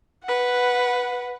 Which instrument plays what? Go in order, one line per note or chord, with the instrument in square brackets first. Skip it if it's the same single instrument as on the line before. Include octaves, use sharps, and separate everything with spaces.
[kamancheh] B4 F#5